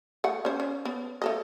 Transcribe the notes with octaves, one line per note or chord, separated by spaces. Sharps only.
A3 F#5
C#4 C5
C#4
B3
A3 A4 D#5